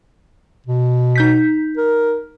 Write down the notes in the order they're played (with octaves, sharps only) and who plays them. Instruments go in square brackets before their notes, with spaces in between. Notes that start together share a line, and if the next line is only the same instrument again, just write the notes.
[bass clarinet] B2
[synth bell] D#4 G6 B6
[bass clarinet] A#4